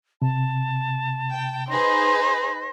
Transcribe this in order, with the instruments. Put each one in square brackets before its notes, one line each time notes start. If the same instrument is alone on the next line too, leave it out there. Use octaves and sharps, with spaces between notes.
[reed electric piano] C3 [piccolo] A5
[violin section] G5
[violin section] D#4 G#4 B4 [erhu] C5 [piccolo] A#6